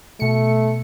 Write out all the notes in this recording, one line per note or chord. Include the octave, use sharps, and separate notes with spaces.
B2 A3 C#7